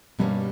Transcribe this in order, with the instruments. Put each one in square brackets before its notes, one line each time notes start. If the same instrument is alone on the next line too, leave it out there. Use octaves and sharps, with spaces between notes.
[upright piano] G2 [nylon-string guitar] B2 G3 A#3 C#4